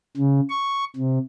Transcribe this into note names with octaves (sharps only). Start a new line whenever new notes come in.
C#3
C#6
C3